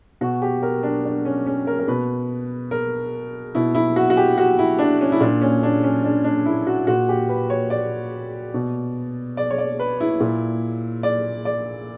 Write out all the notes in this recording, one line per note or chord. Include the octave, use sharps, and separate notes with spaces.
B2 F#4
G4
A#4
D4
D4
C#4
C#4
A#4
A#4
B2 B4
A#4
B2 E4
E4
F#4
F#4
G4
F#4
E4
D4
C#4
E4
A#2 D4
C#4
D4
C#4
D4
D4
E4
F#4
A#2 F#4
G4
B4
C#5
D5
B2
D5
C#5
D5
B4
E4
A#2
D5
D5